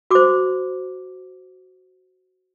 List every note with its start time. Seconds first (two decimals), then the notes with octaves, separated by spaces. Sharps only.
0.11 F#4 C5 D6